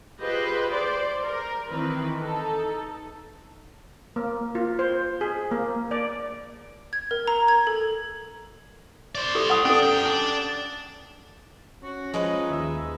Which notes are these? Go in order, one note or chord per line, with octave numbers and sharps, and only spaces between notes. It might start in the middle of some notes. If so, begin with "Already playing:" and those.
F4 G4 G#4 B4 C5 D#5
C5 D5 C6
A#4
D#3 E3 C4 B4
D#4 A4
A#3
F4
C5
G#4
A#3
D5
G#6
A#4
A#5
G#6
A4
C5 D5
G4 A4
F#5 G#5 D#6
C#4 D4 A4
F#2 G5
D4 G#5
C#4 F#4
F3 G#3 D#4 B4 D#5
D#2 E5